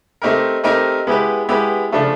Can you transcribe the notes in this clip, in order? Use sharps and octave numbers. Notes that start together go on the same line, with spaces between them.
A3 C4 D#4 G4 A#4
A3 C4 D#4 G4 A#4
G#3 B3 E4 G4 B4
G#3 B3 E4 G4 B4
C#3 F3 A3 D4